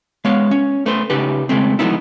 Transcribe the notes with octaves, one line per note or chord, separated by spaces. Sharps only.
G#3 B3 C#5 F5
C#4
A3 B4 C5
C#3 D#4 G4 B4
C#3 G#3 A3 C4
F3 F#3 G#3 B3 D#4 E4